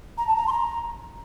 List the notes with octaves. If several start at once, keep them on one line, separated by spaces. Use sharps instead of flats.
A#5
A5
A#5
C6
A#5